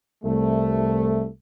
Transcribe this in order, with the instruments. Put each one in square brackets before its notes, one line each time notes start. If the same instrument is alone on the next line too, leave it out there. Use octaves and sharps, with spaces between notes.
[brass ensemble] C2 A3